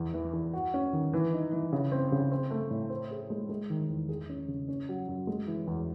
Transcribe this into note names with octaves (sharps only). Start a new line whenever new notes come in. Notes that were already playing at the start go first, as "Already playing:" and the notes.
Already playing: E2
E3
E2
F#4
C#4
D#3
E3
D#4
E3
C#3
C4
C#3
C4
A3
A2
C5
G#4
G#3
G#3
D#3
E2
G#4
C#4
C#3
C#4
F#3
F#2
G#3
E3
E2